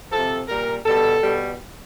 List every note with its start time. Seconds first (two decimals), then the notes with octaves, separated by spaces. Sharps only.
0.11 C3 F3 A4
0.48 A#2 G3 A#4
0.86 B2 G3 A4
1.23 B2 G3